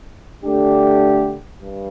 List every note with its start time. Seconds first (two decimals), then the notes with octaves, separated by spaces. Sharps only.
0.44 D3 A3 D4 G4
1.60 G2